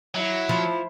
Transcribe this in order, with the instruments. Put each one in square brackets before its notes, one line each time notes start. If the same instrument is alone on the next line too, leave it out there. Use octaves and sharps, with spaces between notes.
[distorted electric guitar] F#3 [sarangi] E4
[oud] F3 [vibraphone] B5